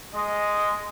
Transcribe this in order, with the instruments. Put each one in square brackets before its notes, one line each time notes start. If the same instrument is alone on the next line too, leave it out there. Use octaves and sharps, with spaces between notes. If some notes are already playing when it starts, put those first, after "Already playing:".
[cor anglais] G#3 [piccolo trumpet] D#5